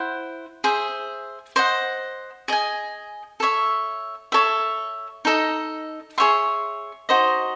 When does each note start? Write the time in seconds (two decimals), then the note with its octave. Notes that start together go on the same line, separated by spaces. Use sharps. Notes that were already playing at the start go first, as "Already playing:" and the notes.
Already playing: E4 C5 F#5
0.64 G#4 C5 E5
1.56 C5 D#5 F#5
2.48 G#4 D#5 G#5
3.40 A4 C#5 E5
4.32 A4 C#5 E5
5.25 D#4 A4 D#5
6.18 G#4 C#5 E5 C6
7.09 D#4 F#4 C5 D#5